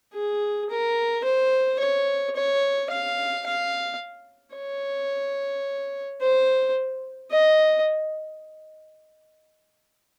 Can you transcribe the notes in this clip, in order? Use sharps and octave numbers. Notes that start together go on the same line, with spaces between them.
G#4
A#4
C5
C#5
C#5
F5
F5
C#5
C5
D#5